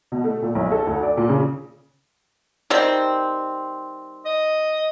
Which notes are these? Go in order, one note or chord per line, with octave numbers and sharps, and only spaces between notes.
B2
A3
A#2
B1
A4
D2
D5
A#2
C#3
D#3 G3 C4
D#5